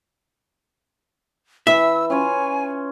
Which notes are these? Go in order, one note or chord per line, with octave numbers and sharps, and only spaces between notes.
E3 E5 E6
C#4 F4 C#5 G#5